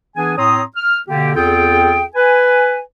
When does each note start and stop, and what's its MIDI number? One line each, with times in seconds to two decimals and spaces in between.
0.16 0.35 52
0.16 0.35 59
0.16 0.35 62
0.16 0.35 68
0.16 0.35 80
0.37 0.61 45
0.37 0.61 60
0.37 0.61 73
0.37 0.61 82
0.37 0.61 84
0.37 0.61 87
0.76 0.99 89
1.08 1.34 47
1.08 1.34 50
1.08 1.34 58
1.08 1.34 67
1.35 2.03 40
1.35 2.03 60
1.35 2.03 65
1.35 2.03 68
1.35 2.03 69
1.35 2.03 79
2.15 2.79 71
2.15 2.79 80